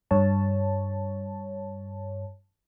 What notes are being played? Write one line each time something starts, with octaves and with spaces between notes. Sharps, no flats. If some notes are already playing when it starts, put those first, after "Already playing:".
G2 C#5 A5